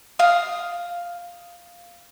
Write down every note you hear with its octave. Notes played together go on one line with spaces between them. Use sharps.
F5 D#6